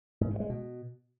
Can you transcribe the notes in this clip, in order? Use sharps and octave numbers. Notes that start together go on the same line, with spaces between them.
G#2
G2
G#3
B2